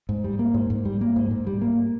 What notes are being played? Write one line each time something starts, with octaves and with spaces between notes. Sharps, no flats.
G#2
G3
A#3
G#2
G#2
G3
A#3
G#2
G#2
G3
A#3